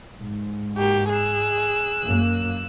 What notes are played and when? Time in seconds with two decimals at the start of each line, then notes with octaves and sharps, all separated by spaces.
0.19 G#2
0.78 A#3 F#4 G4
1.09 G#4 E6 F#6
2.03 F#2 A#3